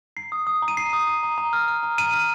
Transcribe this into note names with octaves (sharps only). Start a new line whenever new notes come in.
A#5 C7
D#6
D#6
A#5
D#7
A#5 C7
D#6
D#6
A#5
A#5
F6
F6
A#5
A#5 D#7
F6